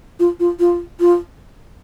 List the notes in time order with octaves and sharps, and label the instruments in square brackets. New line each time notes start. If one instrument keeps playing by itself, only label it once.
[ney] F4
F4
F4
F4